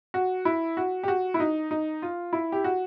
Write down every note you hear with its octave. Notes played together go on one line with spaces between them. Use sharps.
F#4
E4
F#4
G4
F#4
E4
D#4
D#4
F4
E4
G4
F#4